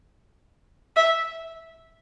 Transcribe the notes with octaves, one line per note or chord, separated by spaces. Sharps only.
E5